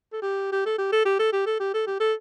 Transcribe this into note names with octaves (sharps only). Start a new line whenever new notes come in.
A4
G4
G4
A4
G4
A4
G4
A4
G4
A4
G4
A4
G4
A4